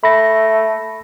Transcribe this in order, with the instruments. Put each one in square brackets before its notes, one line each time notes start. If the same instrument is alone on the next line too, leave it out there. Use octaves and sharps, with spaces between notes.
[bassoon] A3 [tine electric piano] B5 A#6